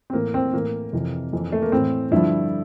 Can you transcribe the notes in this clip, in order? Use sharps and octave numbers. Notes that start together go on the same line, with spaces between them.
C4
A2 E3 A#3
C4
A2 E3 A#3
F2 C3 E3
F2 E3
A3
A#3
A2 E3 C4
G2 D3 F3 E4